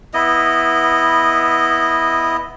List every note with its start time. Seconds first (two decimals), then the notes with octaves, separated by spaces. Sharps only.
0.14 B3 E4 D#5